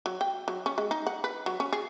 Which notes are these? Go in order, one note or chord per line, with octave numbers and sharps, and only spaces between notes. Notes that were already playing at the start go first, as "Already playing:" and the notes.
F#3
G5
F#3
C#4
G#3
D#4
F#5
B4
F#3
C#4
G#4